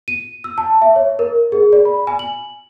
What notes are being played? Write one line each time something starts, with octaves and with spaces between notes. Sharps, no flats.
D#7
E6
A5
E5
C#5
A#4
G#4
D5
B5
G#5
F#7